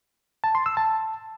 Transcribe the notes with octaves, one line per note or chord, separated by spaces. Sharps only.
A5
C6
E6
A5